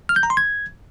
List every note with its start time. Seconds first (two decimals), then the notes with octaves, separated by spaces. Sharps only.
0.09 F6
0.16 G6
0.23 A#5
0.30 C6
0.37 G#6